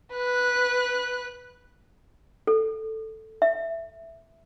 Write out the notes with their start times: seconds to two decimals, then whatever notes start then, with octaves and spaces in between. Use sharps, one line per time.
0.14 B4 F#6
2.47 A4
3.42 E5